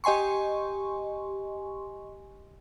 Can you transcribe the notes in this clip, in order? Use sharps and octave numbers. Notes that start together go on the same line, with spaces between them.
G4 D#5 G#5 C6 C#6